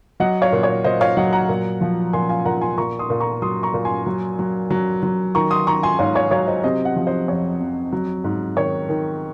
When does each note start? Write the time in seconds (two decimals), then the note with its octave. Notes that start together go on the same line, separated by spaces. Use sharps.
0.20 F#3 D#5 F#5
0.42 C#5 F5
0.53 A#2
0.63 C#5
0.84 A#2 C5 D#5
1.01 C#5 F5
1.17 F#3 D#5 F#5
1.33 F#5 A#5
1.49 A#2
1.81 F3
2.13 A#2 G#5 C6
2.29 F5 G#5
2.45 A#2 F#5 A#5
2.61 G#5 C6
2.77 A#2 A#5 C#6
2.99 C6 D#6
3.10 A#2
3.20 A#5 C#6
3.42 F#3 C6 D#6
3.63 A#5 C#6
3.74 A#2
3.85 G#5 C6
4.06 F#3
4.39 F#3
4.70 F#3
5.03 F#3
5.35 D#3 A#5 C#6
5.51 C6 D#6
5.67 D#3 A#5 C#6
5.83 G#5 C6
5.99 G#2 C#5 F5
6.15 C#5 F5
6.31 F#3 C#5 F5
6.47 C5 D#5
6.63 C3 C5 D#5
6.85 D#5 F#5
6.96 F3
7.07 C5 D#5
7.28 F2 C#5
7.60 F2
7.92 F#3
8.24 G#2
8.57 D#3 C#5
8.89 D#3